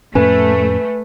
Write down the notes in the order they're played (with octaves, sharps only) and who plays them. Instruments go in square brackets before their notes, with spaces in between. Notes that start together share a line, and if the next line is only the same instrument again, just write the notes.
[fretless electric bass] F2 A2 C#4 [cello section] A3 [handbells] B4 G#5